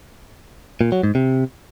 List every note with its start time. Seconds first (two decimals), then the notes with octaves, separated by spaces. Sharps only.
0.81 A#2
0.92 F#3
1.04 G#2
1.15 C3